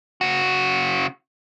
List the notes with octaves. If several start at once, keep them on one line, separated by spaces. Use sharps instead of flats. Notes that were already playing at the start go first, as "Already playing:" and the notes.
C#3 F#4